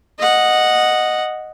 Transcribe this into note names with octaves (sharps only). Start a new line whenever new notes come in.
D#5 F#5